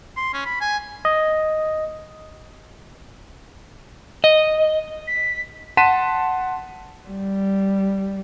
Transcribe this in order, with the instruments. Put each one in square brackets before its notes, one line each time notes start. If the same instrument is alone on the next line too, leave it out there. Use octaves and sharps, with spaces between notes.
[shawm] C6
C#4
B5
G#5
[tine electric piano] D#5
[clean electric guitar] D#5
[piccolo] B6
[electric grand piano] F#5 A5 C6 B6 D#7 E7
[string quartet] G3